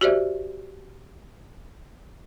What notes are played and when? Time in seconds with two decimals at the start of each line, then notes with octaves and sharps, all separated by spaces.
0.01 F#4 G4 C5 D5 E5